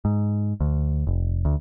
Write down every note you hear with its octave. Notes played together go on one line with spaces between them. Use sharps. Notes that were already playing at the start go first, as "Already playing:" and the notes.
G#2
D2
F1
D2